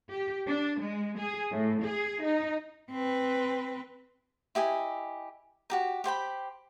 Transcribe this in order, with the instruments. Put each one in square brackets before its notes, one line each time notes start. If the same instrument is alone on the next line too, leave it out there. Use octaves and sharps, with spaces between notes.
[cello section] G4
D4
G#3
G#4
A2
G#4
D#4
[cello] C4 B4
[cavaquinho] E4 G4 D#5 G#5
F#4 G4 A#4
G4 C5 G5 B5